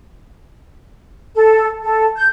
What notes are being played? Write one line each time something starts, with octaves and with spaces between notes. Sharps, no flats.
A4
A4
G6